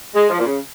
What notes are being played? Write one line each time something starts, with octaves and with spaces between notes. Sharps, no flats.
G#3
F3
A#2
C#3